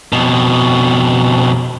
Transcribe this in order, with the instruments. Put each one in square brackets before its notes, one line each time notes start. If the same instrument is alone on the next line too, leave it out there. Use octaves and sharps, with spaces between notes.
[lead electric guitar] F2 B2